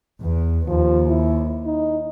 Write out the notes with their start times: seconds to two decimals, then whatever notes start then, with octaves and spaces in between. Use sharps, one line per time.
0.21 E2
0.68 D#2 F3
1.08 E4
1.66 D#4